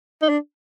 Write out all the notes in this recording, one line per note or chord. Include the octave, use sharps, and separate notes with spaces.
D#4
D4